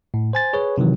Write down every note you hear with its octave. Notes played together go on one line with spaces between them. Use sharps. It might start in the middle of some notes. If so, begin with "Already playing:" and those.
A2
C5 G#5 A6
G#4 B4 C#5
C3 D#3 E3 F#3